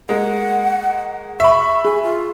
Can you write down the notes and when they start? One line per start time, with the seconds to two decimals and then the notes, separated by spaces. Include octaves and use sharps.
0.09 G#3 A#3 F#5
1.40 E5 B5 C#6
1.85 G#4 G#5
2.03 F4